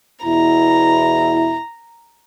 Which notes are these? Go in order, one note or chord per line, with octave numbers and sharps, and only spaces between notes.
E2 B2 E4 A#5